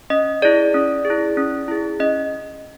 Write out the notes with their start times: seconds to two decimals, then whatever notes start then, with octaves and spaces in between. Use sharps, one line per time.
0.10 C#4 D#5
0.42 E4 G#4 D5
0.74 C#4
1.05 G#4
1.10 E4
1.37 C#4
1.68 E4 G#4
2.00 C#4 D#5